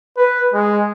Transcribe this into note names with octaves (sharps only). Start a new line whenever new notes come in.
B4
G#3